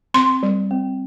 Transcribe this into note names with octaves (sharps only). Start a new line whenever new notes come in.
C4 C6
G3
C4